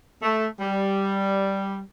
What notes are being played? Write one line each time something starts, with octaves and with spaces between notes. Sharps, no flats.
A3
G3